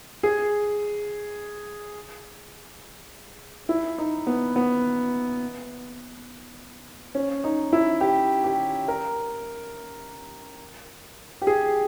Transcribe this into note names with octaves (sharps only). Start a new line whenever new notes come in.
G#4
E4
D#4
B3
B3
C#4
D#4
E4
G4
G4
A#4
G4
G#4